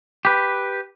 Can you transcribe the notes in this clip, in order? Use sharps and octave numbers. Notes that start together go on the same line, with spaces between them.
G4 B4